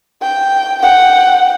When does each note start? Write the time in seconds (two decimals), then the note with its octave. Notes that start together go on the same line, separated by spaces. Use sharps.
0.22 G5
0.82 F#5 G5